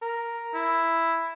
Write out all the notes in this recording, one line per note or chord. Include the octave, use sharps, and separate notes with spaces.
A#4
E4